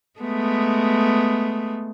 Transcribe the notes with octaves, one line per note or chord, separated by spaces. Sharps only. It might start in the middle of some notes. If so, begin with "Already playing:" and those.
G#3 A3 B3